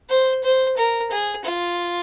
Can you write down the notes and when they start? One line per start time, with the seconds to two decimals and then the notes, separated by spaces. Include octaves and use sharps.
0.09 C5
0.44 C5
0.77 A#4
1.11 G#4
1.45 F4